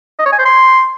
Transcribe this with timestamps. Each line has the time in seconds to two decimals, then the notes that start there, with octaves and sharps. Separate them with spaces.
0.19 D#5
0.26 C#5
0.32 G#5
0.39 C5
0.45 C6